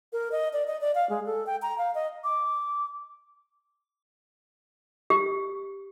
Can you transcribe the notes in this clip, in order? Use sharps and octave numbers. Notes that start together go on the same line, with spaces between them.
A#4
D#5
D5
D#5
D5
F5
G#3
A4
G5
A#5
F5
D#5
D6
G4